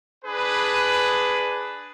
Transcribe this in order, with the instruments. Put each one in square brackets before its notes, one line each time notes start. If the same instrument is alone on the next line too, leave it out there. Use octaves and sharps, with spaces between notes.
[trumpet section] D4 G#4 B4